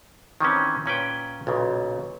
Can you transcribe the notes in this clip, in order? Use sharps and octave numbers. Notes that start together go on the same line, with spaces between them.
D#3 E3 C4 C#4
A#2 C#4 B4 G5
B1 A#2 C#3